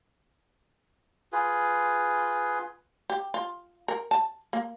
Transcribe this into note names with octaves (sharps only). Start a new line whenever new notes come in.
F4 G#4 B4
G4
F4
A#4
A5
A#3